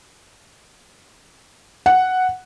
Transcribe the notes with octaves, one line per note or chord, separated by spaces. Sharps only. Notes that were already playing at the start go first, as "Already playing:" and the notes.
F#5